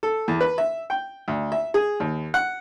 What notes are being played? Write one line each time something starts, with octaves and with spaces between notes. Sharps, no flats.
A4
E2
B4
E5
G5
D2
E5
G#4
D#2
F#5